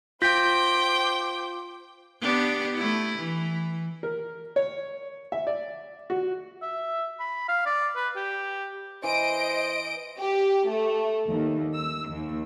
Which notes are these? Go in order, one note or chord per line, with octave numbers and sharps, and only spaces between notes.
F4 C5 G5 D6 G6 A#6 B6
B3 D4 G4
A3 E4
E3
A#4
C#5
E5
D5
F#4
E5
B5
F5
D5
B4
G4
E3 C5 D#5 D7
G4
A3
D#2
E6
D#2